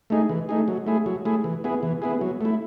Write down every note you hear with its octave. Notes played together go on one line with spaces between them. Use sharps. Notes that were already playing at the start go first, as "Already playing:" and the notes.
A3 D#4 G#4
E3
A3 D#4 G#4
F#3
A3 E4 G#4
F#3
A3 E4 G#4
E3
B3 E4 G#4
E3
B3 E4 G#4
F#3
A3 E4